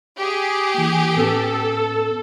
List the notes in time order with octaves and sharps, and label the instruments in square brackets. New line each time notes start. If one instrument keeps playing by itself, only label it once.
[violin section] G4 G#4
[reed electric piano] E3 A#3
[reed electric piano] A2 B3 C#4 [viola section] A4